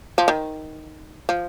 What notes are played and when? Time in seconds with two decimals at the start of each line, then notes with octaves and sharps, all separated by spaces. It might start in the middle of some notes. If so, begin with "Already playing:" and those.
0.18 F3
0.28 D#3
1.29 F3